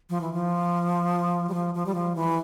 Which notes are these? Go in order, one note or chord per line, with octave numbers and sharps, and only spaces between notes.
F3
E3
F3
G3
F3
F3
G3
F3
E3